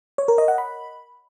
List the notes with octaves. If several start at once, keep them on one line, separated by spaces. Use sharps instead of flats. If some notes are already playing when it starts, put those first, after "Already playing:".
C#5
A#4
D#5
F#5
B5